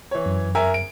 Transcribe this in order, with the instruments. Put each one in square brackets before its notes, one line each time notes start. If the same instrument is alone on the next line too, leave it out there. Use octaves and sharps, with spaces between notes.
[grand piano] E3 C#5
[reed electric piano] F#2
[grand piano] A#4 E5 G#5
D7